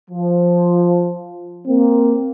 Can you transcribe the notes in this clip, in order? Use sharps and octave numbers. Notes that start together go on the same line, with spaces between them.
F3
A#3 C4